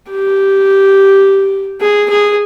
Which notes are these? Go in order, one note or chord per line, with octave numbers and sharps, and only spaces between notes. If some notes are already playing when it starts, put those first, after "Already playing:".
G4
G#4
G#4